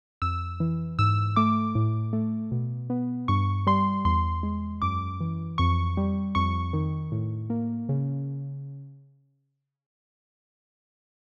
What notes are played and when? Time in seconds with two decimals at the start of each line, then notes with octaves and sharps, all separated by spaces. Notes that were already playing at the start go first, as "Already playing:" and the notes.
0.22 F2 E6
0.60 E3
0.99 G#2 E6
1.36 A3 D6
1.75 A2
2.13 A3
2.52 B2
2.90 B3
3.28 G2 C#6
3.67 G3 C6
4.05 E2 C6
4.43 G#3
4.82 F#2 D6
5.21 E3
5.58 F2 C#6
5.97 G3
6.35 F2 C#6
6.73 D#3
7.12 A2
7.50 A#3
7.89 C#3